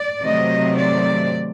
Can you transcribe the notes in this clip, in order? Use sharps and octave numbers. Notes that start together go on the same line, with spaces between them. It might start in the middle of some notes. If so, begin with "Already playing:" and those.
Already playing: D5
C3 D#3 F#3 A3 C4 D#5
D5